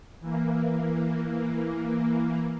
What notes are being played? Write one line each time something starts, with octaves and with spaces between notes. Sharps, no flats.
E3 A#3